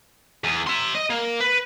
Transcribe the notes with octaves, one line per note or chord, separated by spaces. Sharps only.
E2
E5 C6
D#5
A#3
B4